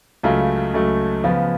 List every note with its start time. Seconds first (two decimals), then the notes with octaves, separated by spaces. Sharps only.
0.23 C#2 C#3 F#3 A3 F4
0.74 C#2 C#3 F#3 A3
1.24 C#3 F3 B3 F4